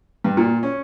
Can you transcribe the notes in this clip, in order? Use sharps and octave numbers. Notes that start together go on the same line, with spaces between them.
G2
A#2
C#4